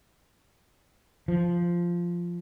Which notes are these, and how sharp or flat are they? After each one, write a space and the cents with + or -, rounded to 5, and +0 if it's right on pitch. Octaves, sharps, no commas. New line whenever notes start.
F3 -5